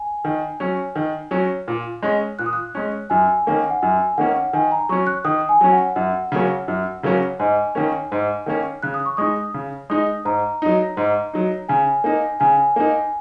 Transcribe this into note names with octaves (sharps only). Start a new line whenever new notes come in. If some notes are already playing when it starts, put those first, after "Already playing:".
Already playing: G#5
D#3
F#3 C#4
D#3
F#3 C#4
A#2
G#3 C#4
A#2 F#6
D#6
F#6
G#3 C#4
F#2 G#5
D#3 A#3 C#4
F#5
F#2 G#5
D#3 A#3 C#4 F#5
D#3 G#5
A#5
F#3 C#4 C#6
F#6
D#3 D#6
G#5
F#3 C#4
F#5
F#2 F#5
C#3 F#3 A#3 C#4
F#2
C#3 F#3 A#3 C#4
G#2 G#5
D#3 A#3 C#4
G#2
D#3 A#3 C#4
C#3 F#6
D#6
C#6
G#3 D#4 D#6
C#3
G#3 D#4 D#6
G#2 A#5
F#3 D#4
G#2
F#3 D#4
C#3 G#5
A#3 D#4
C#3 G#5
A#3 D#4